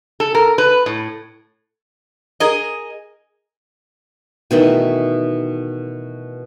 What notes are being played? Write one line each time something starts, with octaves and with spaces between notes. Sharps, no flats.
A4
A#4
B4
A2
G#4 A#4 D#5
B2 D#3 E3 A3